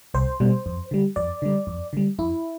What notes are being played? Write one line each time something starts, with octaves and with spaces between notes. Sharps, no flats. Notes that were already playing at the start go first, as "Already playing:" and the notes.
C2 C5
B2 G3
F2
D3 G3
F2 D5
D3 G3
F2
D3 G3
F2 E4